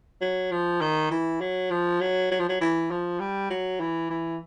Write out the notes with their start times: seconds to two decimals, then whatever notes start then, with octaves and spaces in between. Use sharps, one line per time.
0.21 F#3
0.51 F3
0.81 D#3
1.11 E3
1.41 F#3
1.71 F3
2.01 F#3
2.31 F#3
2.40 F3
2.49 F#3
2.61 E3
2.91 F3
3.20 G3
3.50 F#3
3.80 E3
4.10 E3